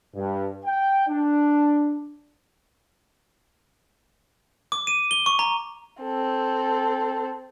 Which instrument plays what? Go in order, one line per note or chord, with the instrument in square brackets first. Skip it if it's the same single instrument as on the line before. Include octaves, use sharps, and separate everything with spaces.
[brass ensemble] G2
G5
D4
[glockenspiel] D6
D#7
G7
C#6
A#5
[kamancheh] C4 A4